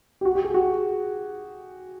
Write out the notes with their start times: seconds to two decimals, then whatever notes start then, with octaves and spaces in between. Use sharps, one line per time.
0.21 G4
0.25 F#4
0.35 G4
0.45 G#4
0.54 F#4